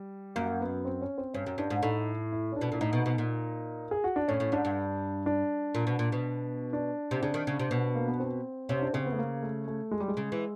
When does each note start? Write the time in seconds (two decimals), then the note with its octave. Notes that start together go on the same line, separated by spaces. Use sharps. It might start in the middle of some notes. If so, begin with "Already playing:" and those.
Already playing: G3
0.36 F#2 A#3
0.61 B3
0.85 C4
1.02 C#4
1.18 C4
1.34 G2 C#4
1.46 F#2
1.58 G2 D4
1.70 G#2
1.82 A2 D#4
2.32 E4
2.52 C#4
2.56 D4
2.61 B2
2.72 A#2 E4
2.81 A2 D#4
2.93 B2
3.06 B2
3.18 A#2
3.91 G#4
4.04 F#4
4.16 D4
4.28 A2 C#4
4.40 A2
4.52 G#2 D4
4.65 G2
5.26 D4
5.75 A#2
5.87 B2
5.99 A#2
6.12 B2
6.73 D4
7.11 C3
7.22 C#3 D4
7.34 D#3
7.47 C#3
7.59 C3
7.71 B2
7.95 A#3
8.08 B3
8.20 C4
8.69 C3 C#4
8.82 D4
8.93 C#3 C4
9.06 B3
9.12 A3
9.18 A#3
9.43 A3
9.67 A3
9.91 G#3
10.00 G3
10.08 G#3
10.17 C#3
10.32 E3